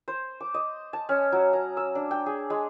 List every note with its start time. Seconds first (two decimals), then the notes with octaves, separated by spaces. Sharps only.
0.08 C5
0.41 D6
0.54 D#5
0.93 A5
1.09 C#4
1.32 F#3
1.53 A#5
1.77 E6
1.95 D4
2.11 G5
2.26 G#4
2.50 G#3